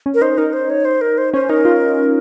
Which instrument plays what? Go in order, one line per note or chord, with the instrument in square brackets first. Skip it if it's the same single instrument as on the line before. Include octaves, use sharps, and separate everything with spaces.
[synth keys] C#4
[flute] A#4
[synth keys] D#4 [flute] C5
[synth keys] D#4 [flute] A#4
[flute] C5
C#5
C5
A#4
C5
[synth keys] C#4 [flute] C5
[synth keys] D#4 [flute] A#4
[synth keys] F4